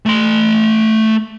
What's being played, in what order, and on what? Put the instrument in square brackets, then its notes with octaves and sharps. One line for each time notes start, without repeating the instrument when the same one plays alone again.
[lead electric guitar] A3 C6